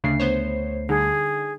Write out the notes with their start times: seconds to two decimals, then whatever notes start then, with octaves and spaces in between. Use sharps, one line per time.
0.04 D2 C#3 A3 D4 C7
0.20 B3 C5 C#5
0.89 D3 G3 D#4 G#4